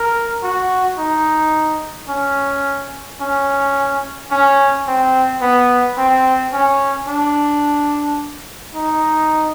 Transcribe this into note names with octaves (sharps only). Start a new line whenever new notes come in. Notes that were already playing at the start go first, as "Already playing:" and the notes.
Already playing: A#4
F#4
D#4
C#4
C#4
C#4
C4
B3
C4
C#4
D4
D#4